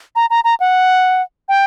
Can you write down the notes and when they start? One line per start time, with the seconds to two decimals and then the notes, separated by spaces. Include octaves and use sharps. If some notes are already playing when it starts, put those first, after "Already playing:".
0.16 A#5
0.30 A#5
0.44 A#5
0.60 F#5
1.49 G5